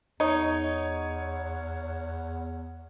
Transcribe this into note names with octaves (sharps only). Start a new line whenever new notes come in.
E2 D#4 C#5